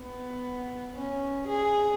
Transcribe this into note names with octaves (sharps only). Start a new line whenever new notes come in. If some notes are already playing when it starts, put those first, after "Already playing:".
Already playing: B3
C#4
G#4